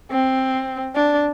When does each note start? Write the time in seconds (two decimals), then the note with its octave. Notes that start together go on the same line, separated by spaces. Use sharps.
0.11 C4
0.96 D4